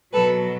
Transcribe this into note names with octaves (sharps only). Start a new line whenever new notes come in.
B2 F#3 A4 B4